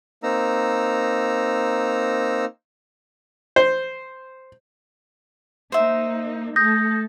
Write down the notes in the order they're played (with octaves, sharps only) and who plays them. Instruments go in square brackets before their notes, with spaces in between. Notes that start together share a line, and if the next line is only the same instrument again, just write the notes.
[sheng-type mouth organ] A#3 C4 D#4 A#5 E6
[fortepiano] C5
[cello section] A#3 D#4 [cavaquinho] C5 E5
[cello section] A3 A4 [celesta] D#6 G6 A#6